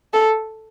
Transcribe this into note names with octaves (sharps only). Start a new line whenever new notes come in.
A4